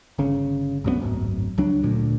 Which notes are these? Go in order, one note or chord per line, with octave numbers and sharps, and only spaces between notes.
G1 C#3
B1 F#2 G#3 B3
D1 G#1 F#2
C#2 F#3 D4
D2 A#2